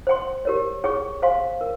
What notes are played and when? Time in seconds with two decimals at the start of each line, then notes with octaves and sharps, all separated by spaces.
0.07 C5 G5 C6
0.45 G4 A#4 C#5
0.84 G#4 C#5 G5 C#6
1.22 C5 F5 G#5 C6
1.61 A#4